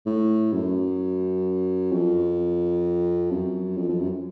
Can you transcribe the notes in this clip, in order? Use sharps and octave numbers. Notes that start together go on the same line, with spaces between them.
A2
F#2
F2
F#2
F2
F2
F#2